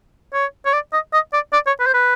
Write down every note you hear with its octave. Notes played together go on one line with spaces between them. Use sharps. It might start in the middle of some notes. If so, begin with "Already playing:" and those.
C#5
C#5
D5
D#5
D#5
D5
D5
C#5
B4
C5
B4